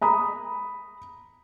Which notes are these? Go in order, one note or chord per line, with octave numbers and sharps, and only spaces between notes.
A#5 B5 D#6